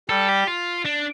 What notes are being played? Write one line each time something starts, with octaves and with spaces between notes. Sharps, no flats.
G3 A4
G4
F4
D4